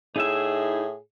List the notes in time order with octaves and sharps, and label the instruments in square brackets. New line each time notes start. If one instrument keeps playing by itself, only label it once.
[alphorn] A2 [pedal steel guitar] D#4 E4 E5 [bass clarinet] G#4